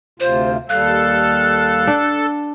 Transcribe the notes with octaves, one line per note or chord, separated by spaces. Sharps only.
D2 C3 F4 C5
D#2 G3 A4 F5 F#6
D4